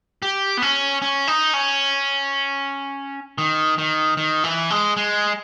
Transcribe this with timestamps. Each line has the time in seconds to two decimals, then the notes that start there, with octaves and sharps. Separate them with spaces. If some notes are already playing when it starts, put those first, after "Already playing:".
0.22 G4
0.57 B3
0.62 C#4
1.02 C#4
1.27 D#4
1.54 C#4
3.38 D#3
3.78 D#3
4.17 D#3
4.44 E3
4.71 G#3
4.97 G#3